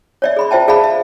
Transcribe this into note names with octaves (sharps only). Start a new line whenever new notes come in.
C#5 D5 E5
G#4 B5 C6
F4 C5 E5 G5 A5
G#4 D5 E5 F5 A5 B5
E5